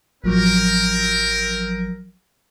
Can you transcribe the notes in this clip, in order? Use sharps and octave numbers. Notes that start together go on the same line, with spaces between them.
A1 F3 F#3 C4 A#4